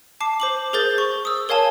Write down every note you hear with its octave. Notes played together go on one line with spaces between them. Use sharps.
A5 D6 C7
C5 D6 F#7
G#4 A#4 C5 G6 A6
C#6
D#6 E6
A#4 C#5 F5 G#5 A5